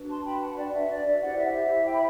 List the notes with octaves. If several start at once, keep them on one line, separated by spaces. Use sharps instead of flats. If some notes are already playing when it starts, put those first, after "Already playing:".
Already playing: D4 F#4 B4
A5 C6
G5 B5
F#5 A5
D5 F#5
E5
D5
E5
E4 G4 C5 D5 F#5
E5
E5 G5
B5